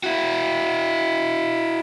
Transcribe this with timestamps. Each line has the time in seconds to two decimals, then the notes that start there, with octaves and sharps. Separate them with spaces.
0.03 E4 F#4